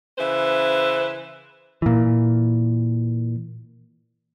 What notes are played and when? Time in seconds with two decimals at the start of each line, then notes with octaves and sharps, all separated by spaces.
0.19 C#3 E3 B4 C5 E5
1.82 A#2 E3